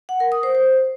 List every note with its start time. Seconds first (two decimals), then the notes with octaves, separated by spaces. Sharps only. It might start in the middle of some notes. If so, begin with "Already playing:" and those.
0.09 F#5
0.20 A#4
0.32 D#6
0.43 C5
0.55 C5